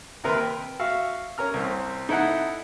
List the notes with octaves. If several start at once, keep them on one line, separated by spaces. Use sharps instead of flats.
D#2 C3 A#4 B4 C6
G5
F#4 E5 F5
C#4 A#4 A#5 F6
C2 C4
D#4 E4 A4 F#5